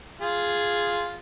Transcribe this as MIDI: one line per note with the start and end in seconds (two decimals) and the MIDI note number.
0.21 1.18 65
0.21 1.18 68